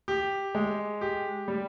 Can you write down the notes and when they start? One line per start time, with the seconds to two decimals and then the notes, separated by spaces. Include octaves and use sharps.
0.08 G4
0.55 G#3
1.01 G4
1.48 G3